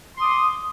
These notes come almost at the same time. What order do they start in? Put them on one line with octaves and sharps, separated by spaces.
C6 D#6 D6